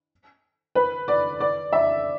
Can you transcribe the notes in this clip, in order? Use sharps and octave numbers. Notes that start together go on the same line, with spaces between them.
B4
D5
D5
E5